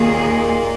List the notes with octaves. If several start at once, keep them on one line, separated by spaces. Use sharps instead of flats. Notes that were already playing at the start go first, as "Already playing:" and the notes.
Already playing: D#2 A#2 D#3 A#3 G#4